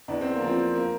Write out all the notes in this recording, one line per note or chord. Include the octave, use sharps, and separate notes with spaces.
E2 D4
C4
A#3
F3
C4
A#3